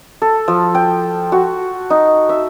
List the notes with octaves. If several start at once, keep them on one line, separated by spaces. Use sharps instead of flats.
A4
F3
G5
F#4
D#4
E5